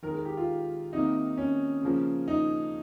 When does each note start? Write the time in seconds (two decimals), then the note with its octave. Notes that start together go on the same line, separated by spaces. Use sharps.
0.02 D#3 A#4
0.08 G#3
0.14 A#4
0.25 G4
0.37 F4
0.93 C3 D#3 A#3 D#4
1.38 C#4
1.83 C#3 F3 A#3
2.28 D#4